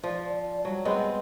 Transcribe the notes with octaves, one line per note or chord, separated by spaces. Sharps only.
F3 D5
D5
F#3 G3
G3 G#3 B3 C4